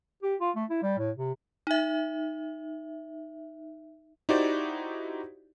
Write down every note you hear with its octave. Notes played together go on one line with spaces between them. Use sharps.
G4
F4
A3
E4
G3
A2
C3
D#4 E5
D#4 E4 F#4 G4 C5 D5